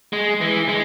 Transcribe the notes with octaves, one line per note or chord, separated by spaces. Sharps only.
G#3
E3
G#3